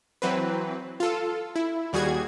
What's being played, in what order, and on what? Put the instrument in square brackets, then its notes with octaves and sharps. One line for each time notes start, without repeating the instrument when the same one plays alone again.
[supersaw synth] E3 F#3 C4 B4
F4 A4
E4
D#2 G3 F#4 G#4 G#6